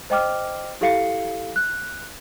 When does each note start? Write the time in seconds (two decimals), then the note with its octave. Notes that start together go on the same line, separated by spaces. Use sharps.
0.10 C5 D#5 G5 D6 F6
0.81 E4 G4 A4 F5 C7 C#7
1.56 F#6